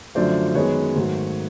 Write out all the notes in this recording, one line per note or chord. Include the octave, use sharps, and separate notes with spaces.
F#2 D3 F3 A3 C5 D5
F#2 D#3 G#3 B3 B4 C#5
G#2 D#3 F#3 A3